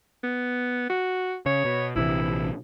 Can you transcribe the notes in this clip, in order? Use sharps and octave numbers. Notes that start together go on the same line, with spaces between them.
B3
F#4
C#3 C#5
B2
A#1 C3 E3 E4